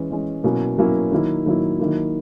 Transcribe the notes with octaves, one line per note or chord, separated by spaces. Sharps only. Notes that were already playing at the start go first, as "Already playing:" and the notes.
Already playing: E3 G#3 C#4
E3 G#3 C#4
B2 F#3 A#3 C#4 E4
B2 F#3 A#3 C#4 E4
D#3 F#3 A#3 E4
D#3 F#3 A#3 E4
D#3 F#3 A#3 E4